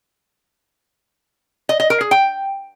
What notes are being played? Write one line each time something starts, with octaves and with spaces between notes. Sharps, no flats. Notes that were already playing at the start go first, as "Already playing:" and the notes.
D#5
D#5
A#4
G#4
G5